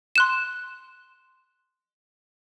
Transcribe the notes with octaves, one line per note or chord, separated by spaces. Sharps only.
C6 F#6 E7